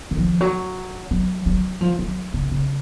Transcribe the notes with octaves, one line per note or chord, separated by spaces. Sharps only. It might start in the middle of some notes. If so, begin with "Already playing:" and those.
D#3
F3
F#3
F#3
F#3
F3
F#3
C#3
C#3